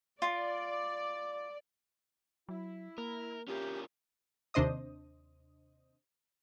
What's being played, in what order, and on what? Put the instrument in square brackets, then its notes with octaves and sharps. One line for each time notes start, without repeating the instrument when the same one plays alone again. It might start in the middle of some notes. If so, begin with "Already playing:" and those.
[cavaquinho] F4 [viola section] D5
[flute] D6
[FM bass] F#3 [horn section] E4
[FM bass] A#3 [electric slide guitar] A#4
[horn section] C#3 E4 G#4 [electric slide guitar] C#4 F4 A#4 [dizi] G4
[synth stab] D#2 C3 D4 C5 D#5 D#6